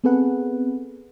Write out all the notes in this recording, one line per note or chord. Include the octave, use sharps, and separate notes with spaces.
B3 C4 G#4 A4 B4 F#5